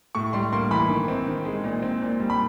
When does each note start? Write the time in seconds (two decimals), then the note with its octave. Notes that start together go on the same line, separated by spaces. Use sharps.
0.15 A2 C#6
0.33 G3 C6
0.52 A#3 C6
0.71 E3 B5
0.90 D#3
1.08 C4
1.27 D#3
1.45 G#3
1.64 A#2
1.82 C4
2.02 A#2
2.20 G3
2.30 B5